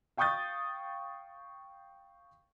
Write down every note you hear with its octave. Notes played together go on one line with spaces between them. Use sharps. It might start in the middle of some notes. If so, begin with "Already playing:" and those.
F5 G5 C#6 D#6 G6 A6